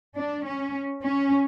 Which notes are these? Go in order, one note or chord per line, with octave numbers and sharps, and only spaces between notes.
D4
C#4
C#4